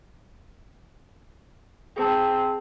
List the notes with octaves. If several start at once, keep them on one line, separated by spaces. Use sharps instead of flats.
C4 G#4 A5